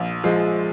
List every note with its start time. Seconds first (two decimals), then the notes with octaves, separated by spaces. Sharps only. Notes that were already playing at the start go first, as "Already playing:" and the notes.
Already playing: A#1
0.24 F3 G#3